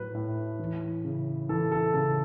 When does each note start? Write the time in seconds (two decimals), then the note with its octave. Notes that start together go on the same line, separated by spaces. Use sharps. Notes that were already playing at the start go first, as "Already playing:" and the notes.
Already playing: A2 F#3 B4
0.14 A2
0.59 E3
1.04 C#3
1.49 E3 A4
1.72 A4
1.94 C#3 A4